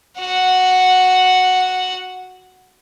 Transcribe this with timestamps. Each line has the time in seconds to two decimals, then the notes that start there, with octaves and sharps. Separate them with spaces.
0.19 F#4 F#5